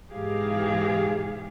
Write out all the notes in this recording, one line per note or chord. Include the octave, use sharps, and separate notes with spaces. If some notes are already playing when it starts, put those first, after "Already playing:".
G#2 B2 E3 G4 G#4 F5